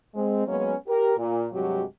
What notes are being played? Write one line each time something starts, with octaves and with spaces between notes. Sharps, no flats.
G#3 C4
F#3 G#3 A#3 B3 C#4
G4 A#4
A#2
G2 C3 F#3 G#3 F#4 G4